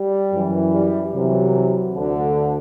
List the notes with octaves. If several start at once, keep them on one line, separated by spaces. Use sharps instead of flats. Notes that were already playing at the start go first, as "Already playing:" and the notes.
Already playing: G3
F#2 E3
G3
C2 C3 E3 F#3
D2 D3